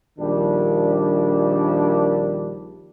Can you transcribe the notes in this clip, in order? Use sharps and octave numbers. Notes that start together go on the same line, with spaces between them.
A#1 D#3 G3 D4